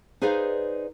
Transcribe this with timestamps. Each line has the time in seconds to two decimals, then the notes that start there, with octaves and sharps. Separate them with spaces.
0.22 D#4 G#4 B4 C5 D5 F5